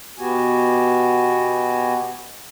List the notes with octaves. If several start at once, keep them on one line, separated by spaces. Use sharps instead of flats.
B2 B3 F#4 G4 G#5